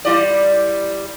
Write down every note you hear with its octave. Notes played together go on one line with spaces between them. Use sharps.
G3 E4 D5